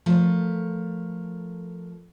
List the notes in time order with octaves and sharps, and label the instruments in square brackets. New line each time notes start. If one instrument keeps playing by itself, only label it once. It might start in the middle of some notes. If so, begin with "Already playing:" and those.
[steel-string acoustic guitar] F3 A3 A4 A#4